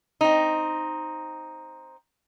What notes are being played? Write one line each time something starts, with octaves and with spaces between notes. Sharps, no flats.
C4 D#4